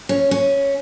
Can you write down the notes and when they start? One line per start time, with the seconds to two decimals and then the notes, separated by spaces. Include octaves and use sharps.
0.09 C#4
0.31 C#4